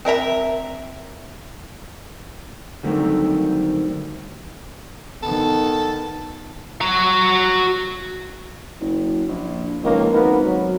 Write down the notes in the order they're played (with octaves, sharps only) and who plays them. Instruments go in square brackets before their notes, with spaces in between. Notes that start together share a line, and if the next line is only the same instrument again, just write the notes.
[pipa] C4 A#4 E5 A#5
[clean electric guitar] D3 D#3 F#3 G3 A3 C4
[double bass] D#3 B3 [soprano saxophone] A4
[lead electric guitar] F#4 A#5
[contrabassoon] F#1
A#1
[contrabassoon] C#2 [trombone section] D#3 F3 A#3
[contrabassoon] G#1 [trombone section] B3 A#4
[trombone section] F#3